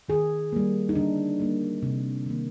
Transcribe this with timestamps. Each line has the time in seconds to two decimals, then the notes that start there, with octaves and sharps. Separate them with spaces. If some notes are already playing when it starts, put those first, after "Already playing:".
0.08 D#3 G#4
0.52 G3 A#3
0.89 D#4
0.95 D3 D4
1.39 G3 A#3
1.82 C3
2.26 D#3 A#3